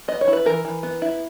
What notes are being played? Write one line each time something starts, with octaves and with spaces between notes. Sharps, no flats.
B3 D#5
C#5
E4
B4
E3 A#4
E3
B3
E4